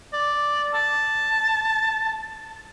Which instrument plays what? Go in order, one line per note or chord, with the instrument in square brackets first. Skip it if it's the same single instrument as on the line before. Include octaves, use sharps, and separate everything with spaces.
[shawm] D5
A5